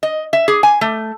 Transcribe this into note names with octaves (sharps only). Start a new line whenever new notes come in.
D#5
E5
G#4
G#5
A3